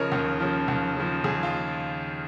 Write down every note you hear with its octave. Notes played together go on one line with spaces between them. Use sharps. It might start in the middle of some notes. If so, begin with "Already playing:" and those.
Already playing: C#3 F3 A#4 C#5 D#5
D#2
C#3 F3
D#2
C#3 F3
D#2 G#4
F4